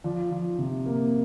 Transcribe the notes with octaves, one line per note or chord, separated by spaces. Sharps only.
F3 D5
F3
C3
A#3